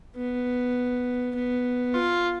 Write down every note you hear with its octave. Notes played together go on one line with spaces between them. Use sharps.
B3
B3
F4